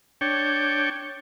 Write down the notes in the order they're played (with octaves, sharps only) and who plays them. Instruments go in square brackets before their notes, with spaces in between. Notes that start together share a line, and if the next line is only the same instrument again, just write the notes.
[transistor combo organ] D4 C#5 G5